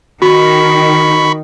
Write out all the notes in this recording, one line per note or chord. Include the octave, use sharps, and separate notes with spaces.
D#3 F#4 B5 C#6